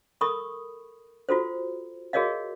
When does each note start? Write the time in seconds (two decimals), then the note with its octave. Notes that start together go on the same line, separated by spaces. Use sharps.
0.21 A4 A#4 B5 C#6 D#6
1.29 F4 F#4 A4 C5
2.13 F#4 G#4 A#4 C#5 D#5 F5